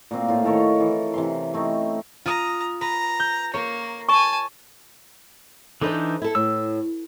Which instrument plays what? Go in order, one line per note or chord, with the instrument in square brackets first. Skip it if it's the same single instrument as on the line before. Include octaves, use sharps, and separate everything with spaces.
[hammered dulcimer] A#2 A#3 C4
A2 F4
D#3 A4 A#4 C#5
E3
C3 E3 C6
A3 C4 C#4 D#4
[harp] F4 D#6 [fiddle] A#5
[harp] B4 [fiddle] A#5
[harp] G6
[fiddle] A#3 [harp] A#4 C#5
[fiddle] G#5 A5 [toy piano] C#6
[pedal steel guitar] E3 D4 D#4 [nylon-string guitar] A4 B4 C5
[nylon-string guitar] E4 A4
[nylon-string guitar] A2 [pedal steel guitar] E6